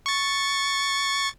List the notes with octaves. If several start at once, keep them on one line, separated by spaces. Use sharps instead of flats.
C#6 A6